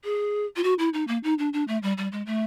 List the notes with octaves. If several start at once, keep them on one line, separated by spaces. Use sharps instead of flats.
G#4
F4
F#4
E4
D#4
A#3
D#4
D4
D4
A3
G3
G3
G#3
A3